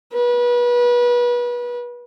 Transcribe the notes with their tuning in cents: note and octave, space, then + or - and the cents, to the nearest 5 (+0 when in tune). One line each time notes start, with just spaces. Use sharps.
B4 -30